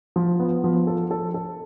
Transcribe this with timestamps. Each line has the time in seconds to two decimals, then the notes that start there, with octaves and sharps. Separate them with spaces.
0.16 F3
0.40 B3
0.64 F3
0.87 A4
1.11 A4
1.34 A4